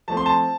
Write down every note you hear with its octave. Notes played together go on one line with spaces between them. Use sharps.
F3 A3 C4 A5
C6
A5